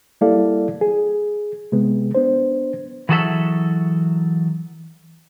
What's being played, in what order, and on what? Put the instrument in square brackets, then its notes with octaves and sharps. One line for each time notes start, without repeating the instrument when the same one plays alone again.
[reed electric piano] G3 A#3 E4 A4 D5 F5
G#4
C3 G#3 B3
B3 D4 C5
[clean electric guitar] E3 F#3 F#4 G#4 A4 E5